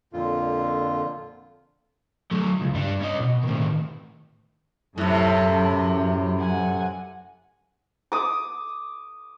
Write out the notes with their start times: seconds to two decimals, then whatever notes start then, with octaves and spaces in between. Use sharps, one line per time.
0.13 F2 A#2 D3 F4
2.31 F#3 A3
2.61 C#2
2.74 G2 G3
3.01 C#4 D#5
3.19 B2
3.43 A2 D#3
4.98 F#2 A2 C3 A4
6.39 F#5 G#5
8.12 D6 D#6